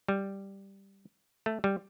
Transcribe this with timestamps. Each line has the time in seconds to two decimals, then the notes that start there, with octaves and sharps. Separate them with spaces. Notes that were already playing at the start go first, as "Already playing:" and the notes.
0.09 G3
1.46 A3
1.64 G3